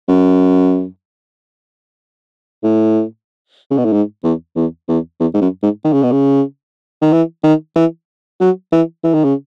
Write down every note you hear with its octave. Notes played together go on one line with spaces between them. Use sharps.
F#2
A2
C#3
B2
A2
G#2
E2
E2
E2
E2
G#2
F#2
G#2
D#3
C#3
B2
C#3
D#3
E3
D#3
E3
F#3
E3
E3
D#3
C#3